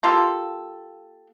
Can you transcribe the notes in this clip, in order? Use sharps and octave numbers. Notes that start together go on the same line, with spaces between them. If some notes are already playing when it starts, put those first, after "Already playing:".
A#3 F4 G4 A4